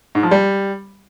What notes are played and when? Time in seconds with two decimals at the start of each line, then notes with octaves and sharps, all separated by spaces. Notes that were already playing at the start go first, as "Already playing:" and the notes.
0.15 G#2
0.23 F3
0.31 G3